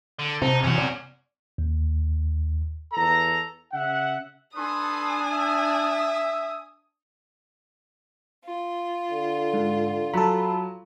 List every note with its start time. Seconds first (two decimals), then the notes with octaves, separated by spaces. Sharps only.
0.19 D3
0.42 C3 D#4 C5 A5
0.63 B2 E3 C#4 F#4
0.78 D5
1.58 D#2
2.93 E2 A4 A#5
3.73 C#3 E5 F#5
4.55 D4 A4 B4 G#5 C6 D#6
5.33 E5
8.43 F4
9.11 D3
9.54 G#2
10.13 F#3 A4 B5